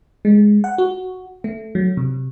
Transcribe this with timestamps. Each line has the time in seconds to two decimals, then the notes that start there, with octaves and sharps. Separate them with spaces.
0.25 G#3
0.64 F#5
0.78 F#4
1.44 A3
1.75 F#3
1.97 C3